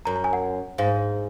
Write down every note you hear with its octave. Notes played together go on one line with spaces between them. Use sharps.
F#2 A#5
A#5
G#5
F#5
G#2 F5